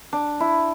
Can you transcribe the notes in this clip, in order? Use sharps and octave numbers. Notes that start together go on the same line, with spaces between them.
D4
E4